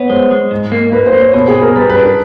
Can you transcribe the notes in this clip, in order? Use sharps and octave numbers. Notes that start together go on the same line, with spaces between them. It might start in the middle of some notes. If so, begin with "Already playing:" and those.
Already playing: B3 C#5
G#3 C5
G#3
G#2
A#3
A#3 B4
C5
A#3
C#5
B2 C5
G#4
B2
A#4
G3 B4
B4
D4
A#4